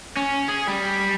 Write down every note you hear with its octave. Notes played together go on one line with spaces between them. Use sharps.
C#4
G#4
G3